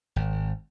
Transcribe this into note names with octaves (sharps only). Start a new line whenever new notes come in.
G#1